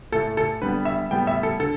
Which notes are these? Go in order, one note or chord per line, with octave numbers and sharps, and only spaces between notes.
A2 A3 A4
A4
D3 G3 B3 B4
E5
A2 G3 B3 G5
E5
A4
D3 A4